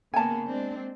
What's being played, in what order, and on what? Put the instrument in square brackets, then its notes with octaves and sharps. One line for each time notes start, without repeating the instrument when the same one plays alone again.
[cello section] C#3 A#3 B3 [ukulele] G#5 A5
[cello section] G#3 C4 D4